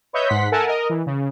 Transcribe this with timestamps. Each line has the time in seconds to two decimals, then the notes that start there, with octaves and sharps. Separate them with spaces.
0.13 B4 C#5 D#5 E5 G6
0.28 G#2 F#5 C6 B6
0.52 A4 A#4 E5 F#5 G#5 A5
0.67 A#4 D#5
0.89 E3
1.06 C#3